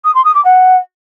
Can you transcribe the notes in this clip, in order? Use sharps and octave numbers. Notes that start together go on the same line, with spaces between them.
D#6
C6
D#6
D6
F#5